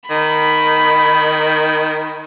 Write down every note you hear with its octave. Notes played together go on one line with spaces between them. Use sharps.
D#3 B5